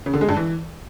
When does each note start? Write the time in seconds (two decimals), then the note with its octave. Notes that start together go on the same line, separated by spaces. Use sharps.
0.06 C#3
0.14 D3
0.21 G#3
0.29 G2
0.36 E3